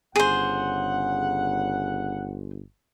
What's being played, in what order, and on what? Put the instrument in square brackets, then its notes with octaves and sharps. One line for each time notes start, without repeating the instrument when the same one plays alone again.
[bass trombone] G1 [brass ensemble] C#3 F#5 [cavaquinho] G#4 C5